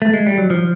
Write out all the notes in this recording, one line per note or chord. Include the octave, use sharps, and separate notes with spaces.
A3
G#3
G3
F#3
F3